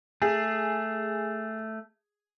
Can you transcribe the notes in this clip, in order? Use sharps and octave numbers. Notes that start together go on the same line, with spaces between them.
A3 G#4